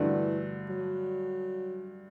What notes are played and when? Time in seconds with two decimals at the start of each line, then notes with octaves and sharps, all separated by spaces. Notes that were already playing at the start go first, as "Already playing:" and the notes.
Already playing: G2 D3 E3 A3 D4 F#4
0.69 F#3